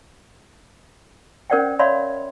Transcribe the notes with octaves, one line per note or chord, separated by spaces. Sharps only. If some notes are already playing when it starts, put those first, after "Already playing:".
C#4 A#4 C5 D5 F#5 G5
C#5 D5 E5 F5 B5 C6